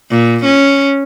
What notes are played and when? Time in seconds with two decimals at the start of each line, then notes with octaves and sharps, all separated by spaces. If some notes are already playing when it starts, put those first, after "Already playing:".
0.11 A#2
0.45 C#4